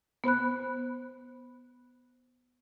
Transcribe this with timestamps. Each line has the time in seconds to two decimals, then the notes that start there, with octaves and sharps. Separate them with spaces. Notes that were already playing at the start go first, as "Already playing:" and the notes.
0.24 B3 C5 B5 F#6